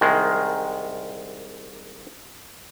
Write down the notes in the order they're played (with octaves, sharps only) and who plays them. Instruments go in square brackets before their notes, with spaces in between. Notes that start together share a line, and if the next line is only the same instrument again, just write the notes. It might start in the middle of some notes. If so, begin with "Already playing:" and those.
[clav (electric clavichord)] C2 D#3 G#3